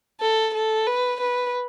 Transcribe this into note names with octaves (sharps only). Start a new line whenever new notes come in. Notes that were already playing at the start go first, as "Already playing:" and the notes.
A4
A4
B4
B4